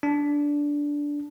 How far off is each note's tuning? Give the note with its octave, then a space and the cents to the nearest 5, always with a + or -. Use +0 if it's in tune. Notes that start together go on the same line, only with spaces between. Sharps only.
D4 -10